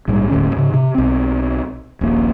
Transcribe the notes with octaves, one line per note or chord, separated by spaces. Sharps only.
A#1 G#2 G3
D#1 A2 D3 C#4
G#2 C#3
C3
B1 C4
D#1 A#1 A#3